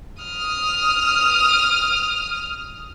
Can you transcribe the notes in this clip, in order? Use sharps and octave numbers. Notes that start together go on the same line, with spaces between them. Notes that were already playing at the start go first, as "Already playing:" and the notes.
D#6 F6